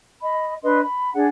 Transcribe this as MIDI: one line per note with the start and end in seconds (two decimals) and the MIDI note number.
0.21 0.53 75
0.21 0.53 83
0.63 0.80 62
0.63 0.80 71
0.63 0.80 75
0.63 0.80 84
0.81 1.10 83
1.14 1.26 62
1.14 1.26 68
1.14 1.26 74
1.14 1.26 78